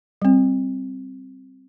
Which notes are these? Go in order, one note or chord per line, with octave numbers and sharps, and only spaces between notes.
G3 C4